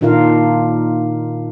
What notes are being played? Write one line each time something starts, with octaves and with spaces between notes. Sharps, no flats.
A#2 D#3 D4 F4 A#4 F5